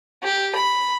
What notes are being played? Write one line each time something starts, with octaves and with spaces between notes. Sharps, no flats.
G4
B5